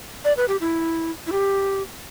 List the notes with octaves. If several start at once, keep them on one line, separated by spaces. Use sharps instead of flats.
D5
B4
G4
E4
E4
G4